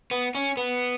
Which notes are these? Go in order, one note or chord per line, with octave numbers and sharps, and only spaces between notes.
B3
C#4
B3